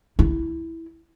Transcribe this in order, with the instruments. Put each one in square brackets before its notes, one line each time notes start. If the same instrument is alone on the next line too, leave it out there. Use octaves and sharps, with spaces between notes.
[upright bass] E4